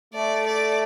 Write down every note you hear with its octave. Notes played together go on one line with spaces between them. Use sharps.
A3 D5
D5